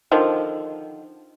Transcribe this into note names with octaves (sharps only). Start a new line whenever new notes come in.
D3 D#3 F3